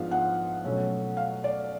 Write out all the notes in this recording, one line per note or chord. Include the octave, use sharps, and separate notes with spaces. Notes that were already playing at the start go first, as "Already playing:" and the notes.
Already playing: G#2 F3 B3 D4 F4 F5
F#5
B2 F#3 A3 C#4
F5
D5